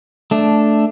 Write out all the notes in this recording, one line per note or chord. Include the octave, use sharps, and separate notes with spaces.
A3 D4